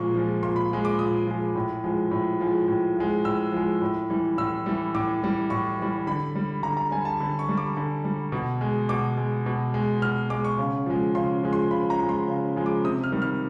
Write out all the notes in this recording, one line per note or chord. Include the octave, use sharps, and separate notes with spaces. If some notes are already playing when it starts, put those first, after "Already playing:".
Already playing: A#2 F3 G#3 C#6
F3 G#3
A#2 C6
B5
F3 G#3
D6
A#2 D#6
F3 G#3
A2
F3 G#3
A2
F3 G#3
A2
F3 G#3
A2 E6
F3 G#3
A2
E3 G3
A2 E6
E3 G3
A2 D6
E3 G3
A2 C#6
E3 G3
D3 B5
G3
D3 A#5
A#5
G3 G#5
A5
D3 B5
C#6
G3
D6
D3
G3
B2
G#3
B2 D6
G#3
B2
G#3
B2 F6
G#3 D6
C#6
C#3
F3 G#3
C#3 C6
F3 G#3
C6
C#3 B5
A#5
F3 G#3
C6
C#3
F3 G#3
D6
C3 D#6
F6
D#3 G3
F6